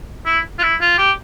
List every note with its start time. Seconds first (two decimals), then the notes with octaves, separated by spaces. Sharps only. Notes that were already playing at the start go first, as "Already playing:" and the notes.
0.26 E4
0.59 F4
0.62 E4
0.81 F4
0.98 G4